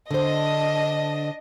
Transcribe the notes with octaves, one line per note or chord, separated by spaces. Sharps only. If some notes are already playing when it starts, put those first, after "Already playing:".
D3 D4 C5 D#5